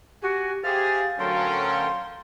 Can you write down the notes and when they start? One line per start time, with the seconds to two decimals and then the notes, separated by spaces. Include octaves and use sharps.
0.22 F#4 G4 G#5
0.64 G4 G#4 C5 E5 F5 F6 A6
1.19 D2 F#3 C#4 A4 A#4 G5 C6